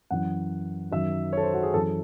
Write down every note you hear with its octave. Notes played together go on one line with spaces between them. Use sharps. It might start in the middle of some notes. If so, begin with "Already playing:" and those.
F#2 E3 F#5
F#2 D#3 F#3 E5
C#5
A4
C5
F#4
G#4
F#2 E3 A4